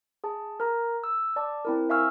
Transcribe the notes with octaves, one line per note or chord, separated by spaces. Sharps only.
G#4 A5
A#4 A#5
E6
D5 A5 D6
C4 E4 A#4
E5 F5 G#5 C#6 E6 F6